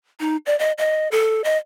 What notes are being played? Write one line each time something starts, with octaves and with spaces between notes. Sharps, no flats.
D#4
D5
D#5
D#5
A4
D#5